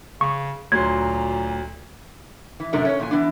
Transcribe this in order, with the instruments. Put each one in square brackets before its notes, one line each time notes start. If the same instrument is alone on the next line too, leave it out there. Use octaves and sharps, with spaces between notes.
[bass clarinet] C#3 [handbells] C#6
[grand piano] D2 F#3 C6 [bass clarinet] A#2 [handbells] G#6
[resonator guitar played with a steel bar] E3
F#2 A2 C3 A3 D4 A#4
C#4 C#5
A#2 E3 G#5
E3 B3 D4